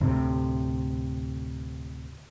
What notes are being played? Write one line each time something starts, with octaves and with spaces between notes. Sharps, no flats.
D2 A2 C3